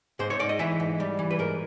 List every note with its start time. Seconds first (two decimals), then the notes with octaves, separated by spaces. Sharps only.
0.19 G#2 C5
0.30 C#5
0.39 G#2 D5
0.49 D#5
0.59 E3 E5
0.80 G#2
1.00 G3
1.19 E3
1.31 B4
1.39 G#2 A#4